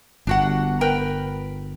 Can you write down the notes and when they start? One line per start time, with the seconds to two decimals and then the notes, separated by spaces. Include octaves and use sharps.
0.27 G1 D4 F#4 F#5
0.81 A#4 B4 G5